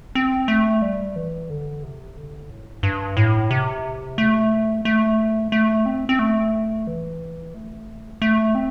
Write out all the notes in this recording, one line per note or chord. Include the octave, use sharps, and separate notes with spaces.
C4
A3
G3
E3
D3
C3
D3
A2
G2
A2
C3
A3
A3
A3
C4
C4
A3
E3
A3
A3
C4